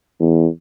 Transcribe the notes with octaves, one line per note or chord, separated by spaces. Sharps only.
E2